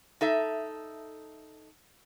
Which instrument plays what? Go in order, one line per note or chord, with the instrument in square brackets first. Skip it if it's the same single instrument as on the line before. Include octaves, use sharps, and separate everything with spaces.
[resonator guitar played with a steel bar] D#4 A4 E5